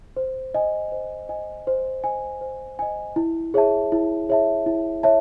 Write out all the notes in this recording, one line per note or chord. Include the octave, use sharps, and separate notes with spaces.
C5
D#5 G#5
C5
D#5 G#5
C5
D#5 G#5
C5
D#5 G#5
E4
G#4 C#5 E5 A5
E4
G#4 C#5 E5 A5
E4
C#5 E5 A5